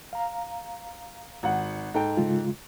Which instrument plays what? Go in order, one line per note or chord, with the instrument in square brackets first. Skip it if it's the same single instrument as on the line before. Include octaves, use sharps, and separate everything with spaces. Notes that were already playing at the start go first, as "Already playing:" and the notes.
[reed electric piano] F5 A#5
[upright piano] G#1 F#5
G#2 A4 G5
[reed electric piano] C#3 G#3 F4